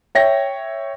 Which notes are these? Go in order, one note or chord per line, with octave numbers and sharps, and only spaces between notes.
C#5 E5 G5 A#6